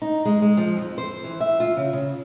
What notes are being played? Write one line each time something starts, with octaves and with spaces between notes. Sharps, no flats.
D#4
G#3
G#3
F3
F2
C5
E3
E5
F4
C#3
C#3